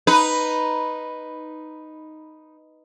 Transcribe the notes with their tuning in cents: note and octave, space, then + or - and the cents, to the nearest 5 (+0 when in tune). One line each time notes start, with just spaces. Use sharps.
D#4 +0 B4 +0